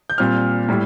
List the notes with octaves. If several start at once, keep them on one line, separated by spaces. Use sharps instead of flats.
G6
A#2 G3 C4 F6
A2 G3